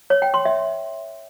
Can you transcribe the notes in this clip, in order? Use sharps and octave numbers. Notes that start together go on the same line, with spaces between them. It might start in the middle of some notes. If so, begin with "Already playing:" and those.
C#5
G5
C6
E5